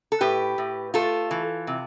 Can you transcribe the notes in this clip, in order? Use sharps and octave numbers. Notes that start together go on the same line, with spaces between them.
A4
A2 G4 B4
A2
A3 F4 A4
E3
C3